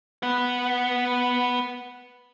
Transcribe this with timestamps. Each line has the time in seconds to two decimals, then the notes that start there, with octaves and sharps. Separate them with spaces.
0.23 B3 F#5